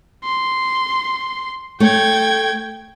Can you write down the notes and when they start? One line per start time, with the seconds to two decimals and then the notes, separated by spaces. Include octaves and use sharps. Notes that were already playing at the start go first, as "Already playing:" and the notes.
0.24 C6
1.80 A3 C#5 G5 G#6